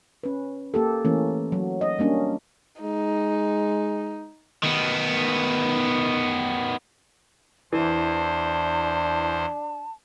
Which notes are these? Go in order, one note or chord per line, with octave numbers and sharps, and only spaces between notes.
C#4 B4
A#3 G4 A4
E3 A3 A#3 C#4
F#3
D#5
G3 A#3 C#4 D4
G#3 D#4
D#3 B3
E2 E3 D4 C5 A5